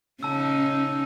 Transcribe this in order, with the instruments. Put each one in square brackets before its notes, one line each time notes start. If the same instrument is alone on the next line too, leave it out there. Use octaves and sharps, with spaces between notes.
[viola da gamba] C#3 C#4 D#4 [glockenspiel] A5 E6